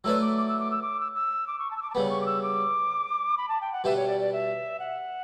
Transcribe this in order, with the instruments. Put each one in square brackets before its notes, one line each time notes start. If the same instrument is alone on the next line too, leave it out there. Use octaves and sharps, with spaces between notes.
[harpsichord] F#3 A3 E4 B4 D5 [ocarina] E6
[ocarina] D6
D6
E6
D6
E6
D6
E6
E6
D6
C#6
A5
E6
D6
A5
[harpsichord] C#3 G3 B3 [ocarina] B5
[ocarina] C#6
D6
E6
D6
B5
A5
G5
F#5
[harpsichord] B2 G3 D4 G4 B4 [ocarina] E5
[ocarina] C#5
D5
D5
E5
F#5